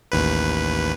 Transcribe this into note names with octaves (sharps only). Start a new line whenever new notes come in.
A1 D#2 B4